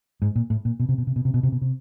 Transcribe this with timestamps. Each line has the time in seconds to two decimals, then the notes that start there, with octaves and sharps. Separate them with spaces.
0.22 G#2
0.36 A#2
0.50 A2
0.65 A#2
0.80 B2
0.89 C3
0.98 B2
1.07 C3
1.16 B2
1.25 C3
1.34 B2
1.43 C3
1.52 B2
1.62 C3